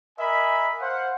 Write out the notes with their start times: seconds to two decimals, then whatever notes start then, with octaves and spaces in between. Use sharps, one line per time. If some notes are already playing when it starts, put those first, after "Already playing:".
0.19 A#4 D#5 E5 G#5 B5
0.81 C5 F5 F#5